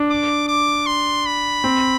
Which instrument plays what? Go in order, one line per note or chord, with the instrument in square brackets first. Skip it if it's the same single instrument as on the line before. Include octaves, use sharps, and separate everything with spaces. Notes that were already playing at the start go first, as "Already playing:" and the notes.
Already playing: [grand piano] D4
[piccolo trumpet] D6
D6
C6
B5
[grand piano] C4